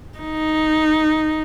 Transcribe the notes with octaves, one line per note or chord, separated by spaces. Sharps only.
D#4